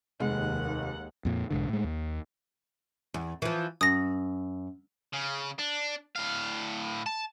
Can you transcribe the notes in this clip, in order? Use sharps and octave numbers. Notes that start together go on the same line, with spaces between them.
F1 D#2 G#3 F#5
F2 A#2
B1 G#2 D3
A2 G#3
D#2
E2
E3 F3
F#2 D#6 A#6
C#3
D4
A2 F5
A5